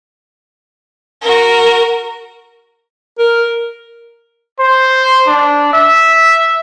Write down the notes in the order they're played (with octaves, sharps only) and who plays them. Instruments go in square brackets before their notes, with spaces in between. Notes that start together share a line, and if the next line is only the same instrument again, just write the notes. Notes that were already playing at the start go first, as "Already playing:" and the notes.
[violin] F#4 A#4
[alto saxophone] A#4
[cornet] C5
D4
E5